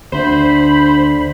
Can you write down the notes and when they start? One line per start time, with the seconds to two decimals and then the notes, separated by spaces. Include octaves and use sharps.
0.12 D2 D3 C5 B5